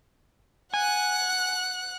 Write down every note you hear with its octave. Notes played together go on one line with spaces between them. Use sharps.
F#5 G#5 F#6